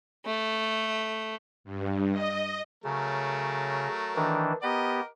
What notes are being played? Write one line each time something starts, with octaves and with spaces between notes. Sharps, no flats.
A3
G2
D#5
C#3 F#3 A3 A#4
D#3 E3 D4
B3 G4 A#4 D#5